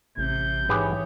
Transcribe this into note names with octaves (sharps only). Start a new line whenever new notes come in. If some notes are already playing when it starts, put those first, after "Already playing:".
A1 C3 G6
G#2 E3 G4 G#4 B4 C#5